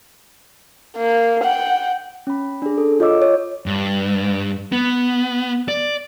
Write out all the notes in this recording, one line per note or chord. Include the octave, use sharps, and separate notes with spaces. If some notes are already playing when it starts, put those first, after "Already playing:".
A#3
F#5 G5
C#4 B5
D4 G#4
A4
F4 C#5 D#5 D6 E6
C#5
G2
B3
D5